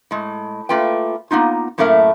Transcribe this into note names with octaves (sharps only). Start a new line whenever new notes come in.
A2 G#3
A3 A#3 F4 B4 G5
A#3 B3 D#4 F4
F#2 A2 A3 A#3 A#4 E5